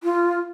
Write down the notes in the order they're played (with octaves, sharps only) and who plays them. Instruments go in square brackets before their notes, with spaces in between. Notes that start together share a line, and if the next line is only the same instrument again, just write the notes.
[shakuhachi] F4